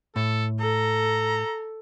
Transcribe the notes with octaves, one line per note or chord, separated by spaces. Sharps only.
A2 A4
A4 A#5